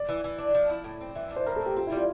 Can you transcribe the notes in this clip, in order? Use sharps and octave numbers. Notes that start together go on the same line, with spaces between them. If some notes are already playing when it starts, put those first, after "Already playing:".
Already playing: D5
E3
E3
D4
F3
E4
A2
C4
E3 E5
D4
C5
A2 A#4
A4
A#3 G4
C4 F4
G3 E4
F4